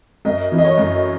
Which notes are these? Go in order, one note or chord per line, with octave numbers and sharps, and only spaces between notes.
F#2 D#5
E3
D#5
C#5
F#2